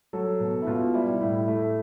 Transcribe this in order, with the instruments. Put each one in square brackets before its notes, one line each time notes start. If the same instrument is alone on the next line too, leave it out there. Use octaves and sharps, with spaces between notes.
[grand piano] F#3 A4
B2
E4
B2 F4
G3 E4
A2 E4
A3